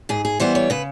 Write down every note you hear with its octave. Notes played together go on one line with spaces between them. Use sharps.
G#2 G#4
G#4
E3 G3 B3 C5
C#5
C#3 B4